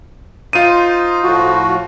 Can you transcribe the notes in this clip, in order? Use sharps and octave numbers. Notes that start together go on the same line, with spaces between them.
D#4 F4 C5 D#7
A2 F3 F#4